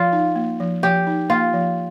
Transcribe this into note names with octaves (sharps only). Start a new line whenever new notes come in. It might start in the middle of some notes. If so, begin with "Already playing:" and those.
Already playing: F3 F4
D#4
A#3
F3
F3 G4
D#4
A#3 F4
F3